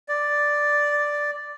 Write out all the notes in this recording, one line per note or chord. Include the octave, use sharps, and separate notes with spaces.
D5